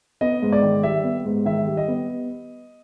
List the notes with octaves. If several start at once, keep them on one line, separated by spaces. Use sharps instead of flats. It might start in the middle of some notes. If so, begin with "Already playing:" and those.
B3 D#5
G#2
D5
D#3
G3 E5
B3
G#2
D#3 E5
G3
D#5
B3